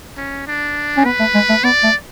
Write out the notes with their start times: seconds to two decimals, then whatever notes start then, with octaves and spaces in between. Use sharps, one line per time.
0.17 C#4
0.47 D4
0.97 C#4
1.05 B3 B4
1.20 A3
1.34 G#3
1.49 A3
1.64 B3 D5
1.83 A3